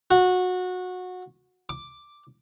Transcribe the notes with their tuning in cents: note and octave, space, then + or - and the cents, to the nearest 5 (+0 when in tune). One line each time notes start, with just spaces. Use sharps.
F#4 -20
D6 +0